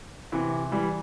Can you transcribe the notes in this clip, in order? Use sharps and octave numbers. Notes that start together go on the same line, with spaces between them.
C3 E3
E3 G3